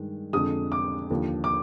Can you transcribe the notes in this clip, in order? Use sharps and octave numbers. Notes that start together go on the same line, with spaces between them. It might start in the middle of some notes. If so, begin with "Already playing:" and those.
Already playing: G2 D#3 G#3
F2 D3 G#3 D#6
D6
D#2 D3 F3
D6